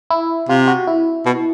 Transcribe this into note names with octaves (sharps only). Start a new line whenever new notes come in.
E4
C3 F4
F#4
E4
B2